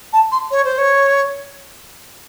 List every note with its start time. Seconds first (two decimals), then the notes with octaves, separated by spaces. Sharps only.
0.13 A5
0.32 C6
0.51 C#5
0.64 C5
0.78 C#5